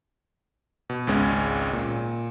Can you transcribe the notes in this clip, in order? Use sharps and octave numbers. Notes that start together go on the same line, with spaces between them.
B2
G#1 C#2 G#3 C#4
A#2